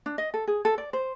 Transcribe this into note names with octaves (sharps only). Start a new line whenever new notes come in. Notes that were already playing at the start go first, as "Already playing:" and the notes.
D4
D#5
A4
G#4
A4
D5
C5